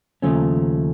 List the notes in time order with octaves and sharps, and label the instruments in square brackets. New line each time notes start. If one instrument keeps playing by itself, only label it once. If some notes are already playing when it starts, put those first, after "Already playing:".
[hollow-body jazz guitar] D#2 C#3 F3 A3 C#4